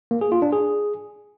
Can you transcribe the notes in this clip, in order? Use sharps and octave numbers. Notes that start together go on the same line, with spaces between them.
A#3
G#4
F4
D4
G#4